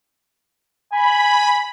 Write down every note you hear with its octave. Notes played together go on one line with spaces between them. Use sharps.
G#5 B5